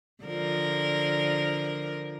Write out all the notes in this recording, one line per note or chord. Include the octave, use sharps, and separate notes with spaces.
D3 F3 A#4